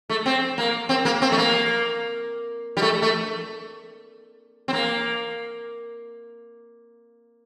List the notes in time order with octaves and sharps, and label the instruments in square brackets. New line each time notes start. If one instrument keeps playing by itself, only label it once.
[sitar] A3
C4
A#3
C4
A#3
C4
A3
A#3
G3
A3
A3
C4
A#3